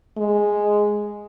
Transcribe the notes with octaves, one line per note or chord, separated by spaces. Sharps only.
G#3